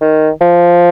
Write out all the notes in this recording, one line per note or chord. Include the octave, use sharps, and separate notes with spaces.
D#3
F3